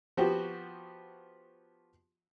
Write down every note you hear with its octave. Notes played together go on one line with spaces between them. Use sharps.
F3 B3 F#4 G4